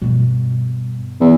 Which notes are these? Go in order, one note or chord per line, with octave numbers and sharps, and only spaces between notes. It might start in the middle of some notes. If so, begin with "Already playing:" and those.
G2 B2
E2